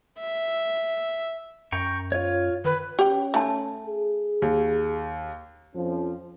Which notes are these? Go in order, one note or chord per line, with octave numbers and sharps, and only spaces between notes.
E5
F#2 G5 A#5 C#6
F4 C#5
D#3 B4
C#4 G4 G5
A3 G#5 A5
G#4
D#2
F2 F3 C#4